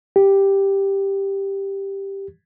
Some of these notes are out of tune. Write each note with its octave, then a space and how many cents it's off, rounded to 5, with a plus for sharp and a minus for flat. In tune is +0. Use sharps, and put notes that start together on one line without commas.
G4 +5